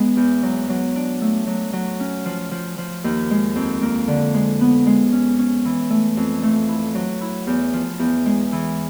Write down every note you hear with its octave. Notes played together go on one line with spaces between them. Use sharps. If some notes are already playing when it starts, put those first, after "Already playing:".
Already playing: G#3 B3
E2
F#3
F#3
D4
A3
F#3
F#3
C#4
F3
F3
F3
D#2
G#3
F2
A#3
D3
G#3
B3
G#3
C#4
C#4
E3
A3
F2
A3
E4
F#3
E4
E2
F3
E2
G#3
E3